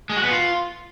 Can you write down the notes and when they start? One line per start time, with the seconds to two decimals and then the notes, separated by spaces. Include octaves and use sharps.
0.10 G#3
0.17 F#4
0.24 B3
0.31 F4